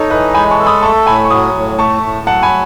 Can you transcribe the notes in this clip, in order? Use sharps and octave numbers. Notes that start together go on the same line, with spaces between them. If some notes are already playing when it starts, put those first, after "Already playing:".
Already playing: D#4 A4 C#5
E3 B4 D#5
G#3 G#5 B5
A5 C#6
A4
B5 D#6
A3 A5 C#6
A2 G#5 B5
C#6
F#3 B5 D#6
A2
A3 A5 C#6
A2
F#3 F#5 A5
G#5 B5